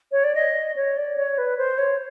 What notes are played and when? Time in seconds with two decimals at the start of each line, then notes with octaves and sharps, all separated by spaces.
0.11 C#5
0.23 D5
0.34 D#5
0.76 C#5
0.97 D5
1.17 C#5
1.38 B4
1.57 C5
1.78 C#5